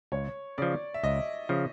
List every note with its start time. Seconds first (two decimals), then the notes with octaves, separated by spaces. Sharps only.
0.12 C#2 C#5
0.58 C#3 F3 D5
0.94 E5
1.03 C#2 D#5
1.49 C#3 F3